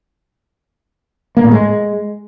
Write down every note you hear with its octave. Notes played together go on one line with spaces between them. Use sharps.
A#3
A2
G#3